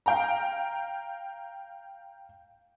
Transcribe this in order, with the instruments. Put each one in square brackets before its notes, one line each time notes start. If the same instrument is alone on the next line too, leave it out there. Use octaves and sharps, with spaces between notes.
[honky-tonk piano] F5 G5 A#5